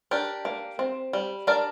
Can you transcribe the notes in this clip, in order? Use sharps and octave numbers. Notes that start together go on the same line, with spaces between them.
D4 G4 A#4
A#3
C4
G3
D4 A#4 D5